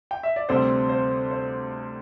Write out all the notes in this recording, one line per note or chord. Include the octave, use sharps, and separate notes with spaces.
G5
E5
D5
D2 C3 G3 C4 C5
C5
C5